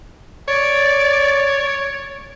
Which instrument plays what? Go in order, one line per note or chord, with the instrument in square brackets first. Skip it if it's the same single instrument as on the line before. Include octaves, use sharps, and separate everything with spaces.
[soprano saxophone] C#5 [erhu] D5